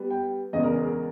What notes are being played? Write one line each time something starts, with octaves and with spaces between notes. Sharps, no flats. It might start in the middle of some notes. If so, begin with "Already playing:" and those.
Already playing: G3 B3
G5
E2 C#3 G#3 B3 D#5
A#4
G#4
A#4